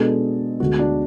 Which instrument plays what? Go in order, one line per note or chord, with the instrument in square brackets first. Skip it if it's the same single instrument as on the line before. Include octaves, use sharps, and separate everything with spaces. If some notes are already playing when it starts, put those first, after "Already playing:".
Already playing: [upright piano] B2 G#3 B3 D4 A4 [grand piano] G#4
[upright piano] D2 D3 G#3 B3 [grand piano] F#4
[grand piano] D4